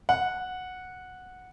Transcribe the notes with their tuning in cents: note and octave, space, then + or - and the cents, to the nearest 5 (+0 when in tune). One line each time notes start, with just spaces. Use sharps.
F#5 -10